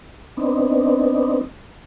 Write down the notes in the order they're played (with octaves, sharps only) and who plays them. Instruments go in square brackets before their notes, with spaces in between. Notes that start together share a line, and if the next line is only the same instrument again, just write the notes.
[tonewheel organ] B3 C4 D4 D#4